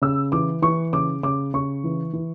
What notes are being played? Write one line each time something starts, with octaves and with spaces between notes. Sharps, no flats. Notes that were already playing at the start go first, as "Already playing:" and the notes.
C#3 E6
E3 D6
E3 C#6
C#3 D6
C#3 D6
C#3 C#6
E3
E3